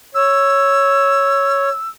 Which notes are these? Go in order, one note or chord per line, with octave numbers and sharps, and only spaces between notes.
C#5 E6